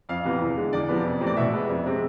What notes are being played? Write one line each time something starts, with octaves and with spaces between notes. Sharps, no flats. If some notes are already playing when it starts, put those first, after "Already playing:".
F2 F5
C3 E3 B3
E2
D3 G#3
E2 D5
C3 F3 B3
F2
C3 E3 A3 C4
D5
B2 E5
G#3 B3
F2
C3 G#3 C4